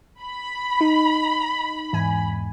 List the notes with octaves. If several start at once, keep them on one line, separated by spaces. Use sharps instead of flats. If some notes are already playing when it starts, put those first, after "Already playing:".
B5
D#4
E2 G#2 G#5